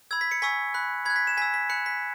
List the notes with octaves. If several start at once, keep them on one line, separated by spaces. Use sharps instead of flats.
B5 E6 G#6
B6
C#7
G#5 C#6 E6 B6
B5 F#6
B5 F#6 G#6
B6
E7
G#5 E6 B6
B6
B5 F#6 C#7
B6